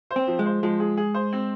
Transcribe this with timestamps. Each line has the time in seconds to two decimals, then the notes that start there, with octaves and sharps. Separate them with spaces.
0.11 C5
0.16 C4
0.27 F3
0.39 G#3
0.46 C5
0.63 F3 G#3
0.80 G#4
0.97 G#4
1.14 C5
1.33 C4